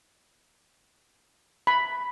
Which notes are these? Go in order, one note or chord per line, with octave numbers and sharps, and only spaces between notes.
B5